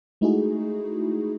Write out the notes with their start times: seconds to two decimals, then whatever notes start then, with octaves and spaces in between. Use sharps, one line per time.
0.21 G#3 A3 D#4 E4 F#4 G#4